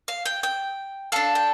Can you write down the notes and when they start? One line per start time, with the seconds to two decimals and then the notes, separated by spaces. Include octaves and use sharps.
0.08 F5
0.25 G5
0.43 G5
1.12 D4 A4 F5
1.35 G5